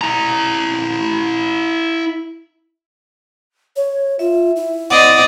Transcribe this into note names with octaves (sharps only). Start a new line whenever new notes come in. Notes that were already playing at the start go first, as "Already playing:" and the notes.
E4 A#5
C#5
F4 E5
E4
C4 D5 D#5 F#5